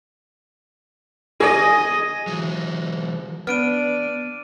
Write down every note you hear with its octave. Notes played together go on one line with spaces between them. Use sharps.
G#4 D#5
E3 F#3
B3 D4 F6 D7 D#7